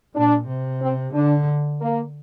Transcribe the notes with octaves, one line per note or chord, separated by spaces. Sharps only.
A#2 D4
C3
C4
D3 D4
A#3